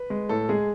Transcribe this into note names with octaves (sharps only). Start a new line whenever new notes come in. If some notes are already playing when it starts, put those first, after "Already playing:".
Already playing: B4
G#3
A2 A4
G#3 G#4